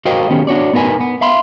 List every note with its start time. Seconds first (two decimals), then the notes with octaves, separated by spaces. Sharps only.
0.05 F#4 A#4 C5 D#5 F5 G5
0.30 D#3 B3 C#4 G4 G#4
0.47 D4 F#4 C#5 D5
0.74 B3 D#4 A#4 B4 G#5
1.01 B3
1.21 E5 F5 B5 C6